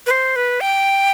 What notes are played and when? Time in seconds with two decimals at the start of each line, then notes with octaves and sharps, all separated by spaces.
0.06 B4
0.11 C5
0.36 B4
0.61 G5